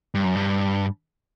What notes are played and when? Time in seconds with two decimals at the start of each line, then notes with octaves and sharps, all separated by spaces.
0.15 G2
0.24 F#2
0.35 G2